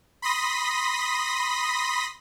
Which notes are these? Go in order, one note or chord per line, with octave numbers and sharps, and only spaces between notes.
B5 C6 D#6 A#6 B6